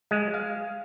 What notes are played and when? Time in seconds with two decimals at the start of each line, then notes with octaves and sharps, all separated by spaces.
0.11 G#3
0.34 F5